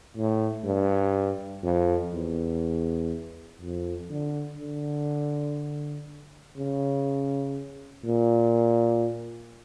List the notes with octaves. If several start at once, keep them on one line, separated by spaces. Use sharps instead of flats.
A2
G2
F2
E2
F2
D3
D3
C#3
A#2